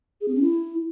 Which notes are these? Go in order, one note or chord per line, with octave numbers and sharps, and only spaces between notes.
G#4
C4
C#4
E4